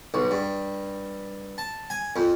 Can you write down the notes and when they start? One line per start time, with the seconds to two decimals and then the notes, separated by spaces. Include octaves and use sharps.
0.14 B1
0.31 G2
1.58 A5
1.90 G#5
2.16 F2